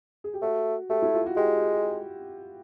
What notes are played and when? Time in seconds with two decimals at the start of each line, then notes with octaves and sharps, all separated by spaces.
0.24 G#4
0.34 G4
0.42 A3 F#4
0.89 A3 G4
1.02 E4
1.15 F4
1.26 F#4
1.37 G#3 G4